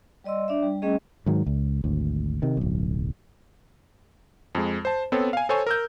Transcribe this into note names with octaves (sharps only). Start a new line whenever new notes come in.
G3 D5 D#5 C6 E6
D4 D5 E5
G3
G3 A3 C#4 G#4 D#5
G#2 D#3 F#3
C#2
G#1 D2
C3 D#3
D1 B1
F2 G#3
C5 A5
B3 C4 A4 C#5
F5 G#5
A4 C5 C#5 G#5 C#6
A#4 E6 G6